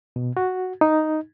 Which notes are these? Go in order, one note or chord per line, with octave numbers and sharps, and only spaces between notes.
B2
F#4
D#4